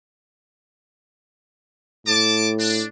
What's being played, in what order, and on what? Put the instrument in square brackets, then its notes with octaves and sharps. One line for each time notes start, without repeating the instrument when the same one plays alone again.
[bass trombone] A2 [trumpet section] A5 D6
[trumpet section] D4